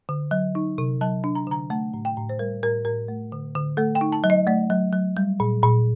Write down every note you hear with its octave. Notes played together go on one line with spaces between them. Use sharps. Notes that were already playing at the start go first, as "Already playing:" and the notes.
D3
F#3
D#4
C3
F#3 A5
D4
A#5
D3 A#5
A3 A5
A2
G5
A2
C5
G3 A#4
A2 A#4
A2 A#4
A3
D3
D3
A3 A4
G5
D#4
A5
F#3
D#5
A3 D5
F#3
F#3
G3
A#2
A#2